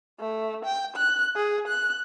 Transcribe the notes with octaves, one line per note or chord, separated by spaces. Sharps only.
A3
G5
F#6
G#4
F#6